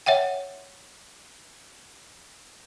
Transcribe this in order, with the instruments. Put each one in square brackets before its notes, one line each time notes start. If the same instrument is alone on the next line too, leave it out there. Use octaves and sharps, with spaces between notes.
[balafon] C#5 E5 F#5 G5